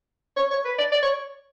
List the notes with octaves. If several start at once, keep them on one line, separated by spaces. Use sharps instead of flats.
C#5
C#5
B4
D5
D5
C#5